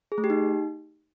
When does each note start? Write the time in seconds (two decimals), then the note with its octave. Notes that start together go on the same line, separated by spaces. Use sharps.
0.12 G#4
0.18 A3
0.24 G4
0.30 D#4